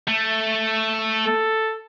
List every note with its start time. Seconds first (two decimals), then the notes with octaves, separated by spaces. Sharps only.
0.08 A3
1.27 A4